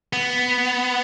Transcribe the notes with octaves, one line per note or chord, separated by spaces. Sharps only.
B3